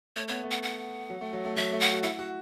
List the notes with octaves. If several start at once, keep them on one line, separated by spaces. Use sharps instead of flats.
A3 C#5
B3 C#5
A3
F#5
F#5
F#3
A3
F#3
A3
F#3 E5
A3
F#5
F#4
E4 F#5
F#4